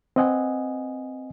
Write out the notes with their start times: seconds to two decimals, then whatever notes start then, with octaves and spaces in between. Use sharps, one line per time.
0.16 C4 B4 D#5 F#5 G#5